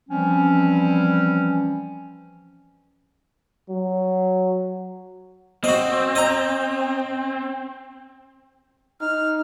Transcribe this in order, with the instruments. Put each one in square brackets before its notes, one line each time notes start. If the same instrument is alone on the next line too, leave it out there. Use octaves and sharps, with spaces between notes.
[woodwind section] E3 F3 G3 C4 C#4
[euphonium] F#3
[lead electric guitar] C4 [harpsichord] F#4 D#5
[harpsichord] D#5 A#5
[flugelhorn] D#4 [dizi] F6